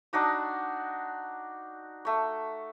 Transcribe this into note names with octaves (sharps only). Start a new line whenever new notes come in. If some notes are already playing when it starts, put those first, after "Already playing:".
D4 D#4 F#4 D#6
A3 C#6